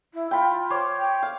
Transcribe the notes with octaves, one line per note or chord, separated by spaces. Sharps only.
E4
F4 G5 B5
C5 C#5 D6
G5
F5